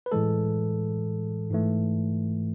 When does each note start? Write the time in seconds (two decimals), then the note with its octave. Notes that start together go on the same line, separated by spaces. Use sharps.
0.06 B4
0.12 A2 E3 G#3 A4
1.50 G#2 E3 A3